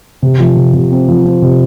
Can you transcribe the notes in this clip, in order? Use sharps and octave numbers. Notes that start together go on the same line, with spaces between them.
C3
F3
C3
C3
C4
F3
C4
C3